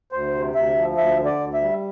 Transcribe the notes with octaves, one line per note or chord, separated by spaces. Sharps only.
D2 C5
C3
D2 E5
F3
D2 E5
D3
D5
D2
E5
G3